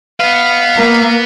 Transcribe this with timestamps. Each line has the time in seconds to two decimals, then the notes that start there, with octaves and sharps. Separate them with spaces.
0.20 B3 B4 F5
0.75 A#3